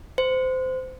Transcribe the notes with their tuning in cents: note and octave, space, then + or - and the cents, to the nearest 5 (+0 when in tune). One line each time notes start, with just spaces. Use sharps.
C5 -20